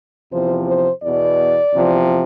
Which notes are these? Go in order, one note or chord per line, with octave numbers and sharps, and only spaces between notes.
E2 C3 F3 C5
C5
E2 B2 D5
E2 C3 F3